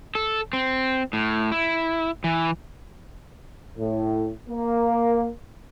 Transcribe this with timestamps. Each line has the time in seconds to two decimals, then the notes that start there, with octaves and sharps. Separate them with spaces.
0.15 A4
0.53 C4
1.13 A2
1.52 E4
2.24 E3
3.77 A2
4.49 A#3